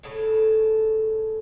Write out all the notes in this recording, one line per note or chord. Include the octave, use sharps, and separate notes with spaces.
A2 C#3 A4